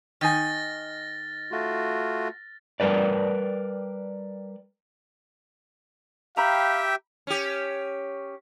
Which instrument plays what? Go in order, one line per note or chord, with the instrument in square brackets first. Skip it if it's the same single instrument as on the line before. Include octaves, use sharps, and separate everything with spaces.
[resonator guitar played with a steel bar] D#3 D#4 G#5 [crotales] F6 A6 A#6
[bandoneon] A3 F4 F#4
[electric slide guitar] G3 A#4 B4 D5
[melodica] G4 E5 G5 [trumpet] F5 [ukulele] A#5 B5
[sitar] C#4 G4